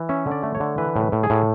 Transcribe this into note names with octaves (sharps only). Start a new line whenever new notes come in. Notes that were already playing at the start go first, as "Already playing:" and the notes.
Already playing: E3
C#4 E5
D3
D5
A3
C#5
D3
E3 B4
A2
B4
A2
G#4
A2